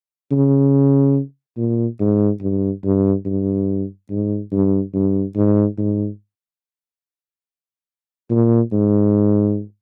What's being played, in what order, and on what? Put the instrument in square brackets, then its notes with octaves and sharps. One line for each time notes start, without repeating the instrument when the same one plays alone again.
[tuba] C#3
A#2
G#2
G2
G2
G2
G#2
G2
G2
G#2
G#2
A#2
G#2